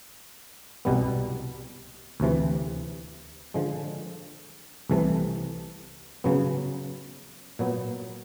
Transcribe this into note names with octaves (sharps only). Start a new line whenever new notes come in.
C2 B2 G3 B3
D2 C3 E3
D3 F3 G#3
C2 C3 E3 A3
C#3 F#3 B3
A#2 F#3 B3